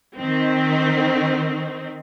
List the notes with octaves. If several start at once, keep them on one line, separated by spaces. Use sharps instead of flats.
D#3 C4